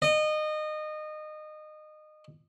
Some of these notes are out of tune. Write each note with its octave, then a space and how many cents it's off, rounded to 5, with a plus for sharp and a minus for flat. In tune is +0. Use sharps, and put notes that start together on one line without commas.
D#5 -25